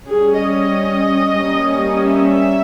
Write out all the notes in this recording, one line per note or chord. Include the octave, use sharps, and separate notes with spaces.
G3 C#4 G#4
D#5
G3 A#3 C#4
E5